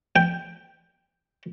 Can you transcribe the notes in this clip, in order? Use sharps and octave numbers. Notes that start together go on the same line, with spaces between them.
G5